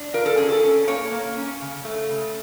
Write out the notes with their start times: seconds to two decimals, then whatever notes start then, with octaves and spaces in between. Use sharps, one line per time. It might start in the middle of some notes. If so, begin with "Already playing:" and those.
Already playing: D4
0.14 F4 A#4
0.26 A4
0.38 C#4 G#4
0.49 A4
0.63 C#4
0.87 A#3 C#5
1.12 A#3
1.37 C#4
1.61 C#3
1.85 A3
2.09 C#3